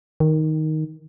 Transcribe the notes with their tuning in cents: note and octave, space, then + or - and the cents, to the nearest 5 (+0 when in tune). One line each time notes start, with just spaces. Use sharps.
D#3 +5